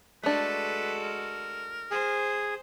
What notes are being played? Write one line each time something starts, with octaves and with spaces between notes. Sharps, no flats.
G#3 A3 D4 F#4 A4 B4
A#4
G#4 C5